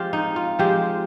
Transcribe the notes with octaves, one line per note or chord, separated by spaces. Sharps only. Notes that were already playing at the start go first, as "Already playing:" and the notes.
Already playing: F3 G#3 C4 F4 G4
D#4
F4
F3 G#3 C4 G4